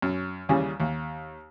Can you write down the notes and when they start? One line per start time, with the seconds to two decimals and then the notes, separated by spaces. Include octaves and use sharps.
0.02 F#2
0.49 D#2 C#3 E3 G3 C#4
0.80 D#2